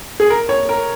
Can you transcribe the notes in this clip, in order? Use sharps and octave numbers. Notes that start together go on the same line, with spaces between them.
G#4
A#4
C#5
A#4